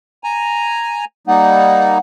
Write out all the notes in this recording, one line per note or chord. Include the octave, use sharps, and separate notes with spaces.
G#5 A#5
G3 A#3 D#4 F#5